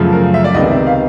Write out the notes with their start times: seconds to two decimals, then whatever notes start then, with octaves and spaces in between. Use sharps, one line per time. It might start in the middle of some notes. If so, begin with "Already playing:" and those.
Already playing: F#2 C#3 F3 A3
0.13 A#4
0.34 E5
0.44 D5
0.54 C#2 C3 D#3 G#3 B3 D#5
0.71 E5
0.87 F5